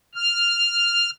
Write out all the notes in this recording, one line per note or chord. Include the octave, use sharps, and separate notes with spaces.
F6